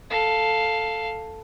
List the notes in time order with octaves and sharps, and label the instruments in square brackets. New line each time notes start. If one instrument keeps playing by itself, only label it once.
[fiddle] A4 F5